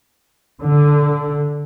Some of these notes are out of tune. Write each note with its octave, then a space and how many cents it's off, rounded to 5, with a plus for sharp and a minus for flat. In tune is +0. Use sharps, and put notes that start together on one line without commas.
D3 -5